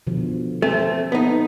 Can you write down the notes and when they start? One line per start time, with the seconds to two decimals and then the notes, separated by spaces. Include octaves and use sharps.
0.07 B2 D3 F3
0.62 A3 C4 A4 C5
1.12 B3 D#4